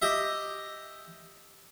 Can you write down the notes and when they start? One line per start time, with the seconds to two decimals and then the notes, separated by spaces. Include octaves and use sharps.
0.02 G4 D#5 E5